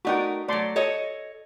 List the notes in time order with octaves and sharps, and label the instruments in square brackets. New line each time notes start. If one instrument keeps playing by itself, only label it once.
[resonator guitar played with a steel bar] A3 D#4 A#4 [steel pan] F#4 D5 G5
[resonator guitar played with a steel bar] F#3 A3 [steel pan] D5 C6
[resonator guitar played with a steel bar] A4 C#5 D#5